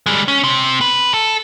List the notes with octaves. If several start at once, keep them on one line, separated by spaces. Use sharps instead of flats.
G3 G#3
C#4
C3
B4
A4